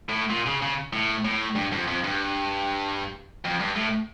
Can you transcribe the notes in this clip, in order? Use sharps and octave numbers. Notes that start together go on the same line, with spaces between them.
A2
A#2
C#3
C#3
A2
A2
G2
F2
F2
G2
F2
G2
A2